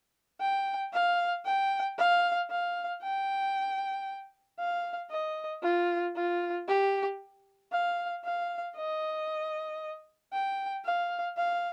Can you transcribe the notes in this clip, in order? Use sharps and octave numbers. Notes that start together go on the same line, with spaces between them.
G5
F5
G5
F5
F5
G5
F5
D#5
F4
F4
G4
F5
F5
D#5
G5
F5
F5